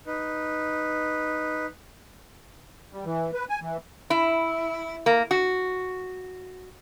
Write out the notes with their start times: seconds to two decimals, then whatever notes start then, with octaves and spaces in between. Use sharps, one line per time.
0.07 D#4 B4
2.93 G3
3.05 E3
3.34 B4
3.49 G#5
3.61 E3
4.10 E4
5.06 A#3
5.31 F#4